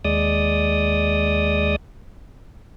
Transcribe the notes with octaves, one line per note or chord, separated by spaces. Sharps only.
D#2 G#3 D5 D#6